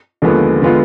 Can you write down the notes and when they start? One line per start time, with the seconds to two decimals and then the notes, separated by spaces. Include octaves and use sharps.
0.22 D#2 D3 F3 G#3 B3
0.62 D3 G#3 B3 F4